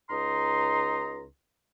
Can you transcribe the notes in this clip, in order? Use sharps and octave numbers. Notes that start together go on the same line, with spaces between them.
C#2 D#4 A#5 C6